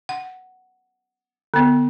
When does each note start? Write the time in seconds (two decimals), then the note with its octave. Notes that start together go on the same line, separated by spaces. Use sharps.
0.09 F#5
1.54 D3 B3